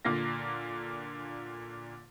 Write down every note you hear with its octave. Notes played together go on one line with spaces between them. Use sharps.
A#2 D3 A#3 F4 A#6